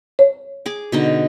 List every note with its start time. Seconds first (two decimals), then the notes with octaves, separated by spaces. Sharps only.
0.19 C#5
0.66 G#4 D6
0.92 B2 D3 D#4